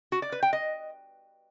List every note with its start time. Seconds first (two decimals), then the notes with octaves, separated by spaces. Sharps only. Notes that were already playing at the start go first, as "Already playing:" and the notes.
0.12 F#4
0.22 D5
0.32 B4
0.43 G5
0.53 D#5